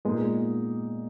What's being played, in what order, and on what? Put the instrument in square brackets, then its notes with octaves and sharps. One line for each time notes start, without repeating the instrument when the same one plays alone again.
[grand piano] A#2 A#3 D#4 [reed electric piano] G#3 B3